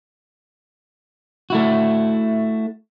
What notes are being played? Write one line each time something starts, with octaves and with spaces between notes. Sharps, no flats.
A3 E4 F#4